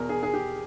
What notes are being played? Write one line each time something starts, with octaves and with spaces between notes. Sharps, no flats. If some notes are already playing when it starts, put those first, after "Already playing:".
Already playing: E2 B2 A#4
G#4
G#4
G4